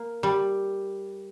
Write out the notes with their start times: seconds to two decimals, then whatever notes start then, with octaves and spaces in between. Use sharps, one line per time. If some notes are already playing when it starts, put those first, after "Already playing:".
Already playing: A#3
0.23 G3